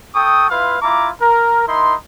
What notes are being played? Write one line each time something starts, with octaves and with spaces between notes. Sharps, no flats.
A4 G5 C#6 D#6
E4 F4 B4 F5 C6
E4 F4 A#5 D6
A#4
D#4 E4 A#4 C6